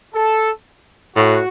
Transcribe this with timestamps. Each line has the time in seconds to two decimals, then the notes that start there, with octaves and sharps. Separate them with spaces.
0.15 A4
1.16 A2 F#4